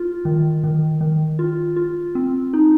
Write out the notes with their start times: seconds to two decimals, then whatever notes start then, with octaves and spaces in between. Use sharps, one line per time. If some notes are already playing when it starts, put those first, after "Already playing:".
Already playing: F4
0.25 D#3
0.64 D#3
1.01 D#3
1.39 F4
1.76 F4
2.15 C4
2.54 D#4